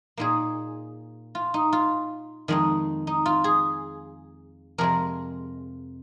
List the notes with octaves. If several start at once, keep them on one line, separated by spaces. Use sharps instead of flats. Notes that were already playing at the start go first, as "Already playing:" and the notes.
A#2 A#3 D#4 G#4
F4
D#4
F4
F2 D#3 G#3 D#4
D#4
F4
G#4
F2 C3 G#3 A#4